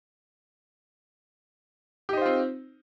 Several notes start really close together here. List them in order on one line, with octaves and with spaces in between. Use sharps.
G4 D#4 C5 F4 C4